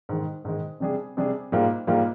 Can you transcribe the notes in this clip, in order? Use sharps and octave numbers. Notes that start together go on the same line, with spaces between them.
G#2 D#3 G#3
G#2 D#3 G#3
C3 G3 D4 G#4
C3 G3 D4 G#4
G#2 G3 A#3 F4
G#2 G3 A#3 F4